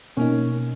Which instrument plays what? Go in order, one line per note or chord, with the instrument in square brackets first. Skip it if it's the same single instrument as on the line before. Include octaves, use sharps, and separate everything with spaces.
[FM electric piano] B2 A#3 D#4 [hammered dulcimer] C#4